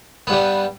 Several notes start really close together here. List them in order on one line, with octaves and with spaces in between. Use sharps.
B3 G2 G3